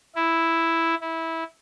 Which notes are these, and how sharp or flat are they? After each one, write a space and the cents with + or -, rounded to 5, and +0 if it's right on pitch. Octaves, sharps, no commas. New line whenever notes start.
E4 +0
E4 -15